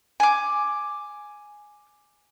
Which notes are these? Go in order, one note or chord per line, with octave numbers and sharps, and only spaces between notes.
G#5 D6